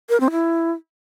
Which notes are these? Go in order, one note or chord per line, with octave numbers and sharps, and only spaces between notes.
A#4
C4
E4